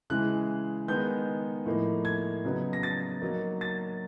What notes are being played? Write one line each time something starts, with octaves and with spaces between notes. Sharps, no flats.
C#3 E3 G#3 F#6
D#3 G#3 B3 D#4 G6
A2 F3 A#3 D#4
G#6
C#3 F#3 B3 D#4
A#6
A6
F#3 A#3 D#4
A6